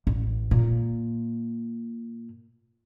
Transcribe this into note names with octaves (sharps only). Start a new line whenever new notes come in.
A1
A#2